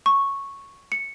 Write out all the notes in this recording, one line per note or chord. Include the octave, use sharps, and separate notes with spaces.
C#6
C#7